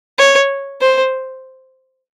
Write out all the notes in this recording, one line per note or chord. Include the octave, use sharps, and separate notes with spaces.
C#5
C5